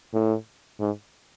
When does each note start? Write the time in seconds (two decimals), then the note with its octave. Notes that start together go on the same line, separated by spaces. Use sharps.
0.14 A2
0.80 G#2